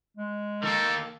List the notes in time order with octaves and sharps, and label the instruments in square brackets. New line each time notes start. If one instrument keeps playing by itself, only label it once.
[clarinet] G#3
[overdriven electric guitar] D#3 A#3 [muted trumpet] A4